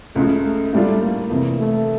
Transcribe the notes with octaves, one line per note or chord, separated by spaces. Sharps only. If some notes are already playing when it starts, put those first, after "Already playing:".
C#2 C#3 F3 A3
A3
A2 G3 A3 D4 F4
A#3
F1 F2 E3
A3